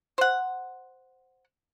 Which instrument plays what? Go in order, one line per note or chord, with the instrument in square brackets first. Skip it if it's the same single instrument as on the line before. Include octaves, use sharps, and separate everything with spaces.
[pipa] C5 F#5